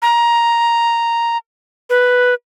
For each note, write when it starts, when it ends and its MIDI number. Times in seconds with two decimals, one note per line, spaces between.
0.02 1.37 82
1.90 2.34 71